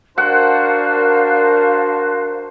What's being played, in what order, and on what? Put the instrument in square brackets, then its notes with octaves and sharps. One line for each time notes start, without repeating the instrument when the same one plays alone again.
[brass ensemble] D4 A#4 [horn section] F#4 C5 [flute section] F5 A5 F#6 [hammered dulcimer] F#5